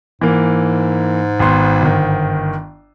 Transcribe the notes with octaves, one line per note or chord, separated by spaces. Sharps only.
G#2 E3 A#3
G#1 B3 C6
G1 D#3